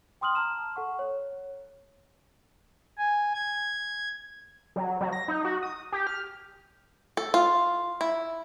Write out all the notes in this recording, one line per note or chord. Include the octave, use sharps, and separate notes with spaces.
G5 C6 D#6 F6 F#7
A5 A#5 F6 E7
A4 F#5 C#6
C#5
G#5
G#6
F#3
F#3
A#6
D#4
F#4
D#6
G4
F6
A4
F4
E4